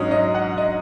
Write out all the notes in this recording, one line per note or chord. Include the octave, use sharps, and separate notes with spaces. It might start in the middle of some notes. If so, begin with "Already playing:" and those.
Already playing: G#2 F#3 C#4 D#5
D#5
F#5
D#5